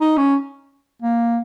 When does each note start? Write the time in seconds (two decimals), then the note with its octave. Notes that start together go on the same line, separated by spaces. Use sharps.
0.01 D#4
0.17 C#4
1.02 A#3